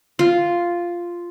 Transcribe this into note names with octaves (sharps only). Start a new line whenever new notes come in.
F4